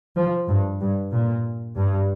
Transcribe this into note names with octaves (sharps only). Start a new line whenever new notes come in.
F3
G2
G2
A#2
G2